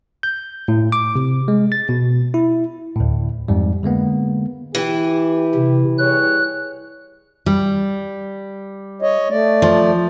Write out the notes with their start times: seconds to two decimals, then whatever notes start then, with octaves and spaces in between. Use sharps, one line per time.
0.23 G6
0.68 A2
0.92 D6
1.16 C3
1.48 G#3
1.72 A6
1.89 B2
2.34 E4
2.96 D2 A2
3.48 F2 G#2 G3
3.83 D3 G#3 A#3 B3
4.75 E3 G4
5.55 C3
5.98 G3 G#4 C#5 F#6
7.46 G3
9.02 C#5 D#5
9.30 A3 D5
9.62 F3